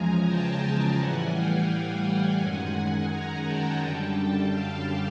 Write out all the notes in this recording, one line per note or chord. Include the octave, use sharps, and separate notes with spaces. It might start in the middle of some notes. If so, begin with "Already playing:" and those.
Already playing: E2 C#3 F3 G#3 G#5 A#5
G5 A5
A2 E3 G3 F#5 G#5
F5 G5
F5 G5
F#2 D#3 G#3 F#5 G#5
G#5 A#5
G5 A5
F#2 D3 G3
F5 G5